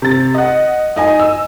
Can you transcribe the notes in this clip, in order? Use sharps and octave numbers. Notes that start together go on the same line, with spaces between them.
C3 A6
D#5 F#5
D#4 D#5 G#5
E6